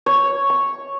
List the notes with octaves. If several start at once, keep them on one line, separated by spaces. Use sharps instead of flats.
C#5
C#6